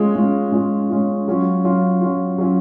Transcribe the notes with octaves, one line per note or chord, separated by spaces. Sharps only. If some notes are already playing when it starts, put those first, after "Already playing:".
Already playing: G#3 C#4 F4
G#3 C#4 F4
G#3 C#4 F4
G#3 C#4 F4
F#3 C#4 F4
F#3 C#4 F4
F#3 C#4 F4
F#3 C#4 F4